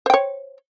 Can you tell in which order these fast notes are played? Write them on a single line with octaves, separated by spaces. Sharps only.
C5 G5 C#5